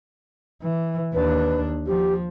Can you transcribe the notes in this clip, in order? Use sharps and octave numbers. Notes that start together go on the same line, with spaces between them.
E3
D#2 D4 B4
F3 G4